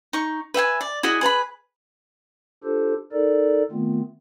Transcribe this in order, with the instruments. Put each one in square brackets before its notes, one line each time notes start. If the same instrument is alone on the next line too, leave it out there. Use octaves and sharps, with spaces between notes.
[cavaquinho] D#4 C#6
B4 E5 G5 G#5
D5
E4 F#4 G#4 D#5
G#4 B4 A5 B5
[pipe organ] D4 F4 G4 A4 C5
D#4 A4 A#4 D5
D#3 A3 B3 C4 F4